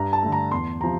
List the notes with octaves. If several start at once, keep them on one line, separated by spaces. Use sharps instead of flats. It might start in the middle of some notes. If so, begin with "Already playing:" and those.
Already playing: G2 A#5
A5
D3 A3
A#5
E2 C6
C3 F3 A#5